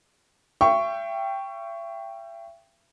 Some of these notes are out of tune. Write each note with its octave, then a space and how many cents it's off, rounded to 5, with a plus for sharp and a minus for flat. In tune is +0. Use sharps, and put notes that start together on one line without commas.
E5 +40 G5 +0 C#6 +0